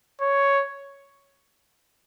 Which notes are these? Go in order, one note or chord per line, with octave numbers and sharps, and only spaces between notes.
C#5